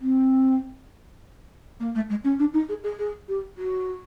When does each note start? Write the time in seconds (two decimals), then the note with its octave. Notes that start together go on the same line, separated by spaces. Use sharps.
0.01 C4
1.80 A#3
1.95 A3
2.09 G#3
2.24 C#4
2.39 D4
2.53 D#4
2.68 G#4
2.83 G#4
2.98 G#4
3.28 G4
3.57 F#4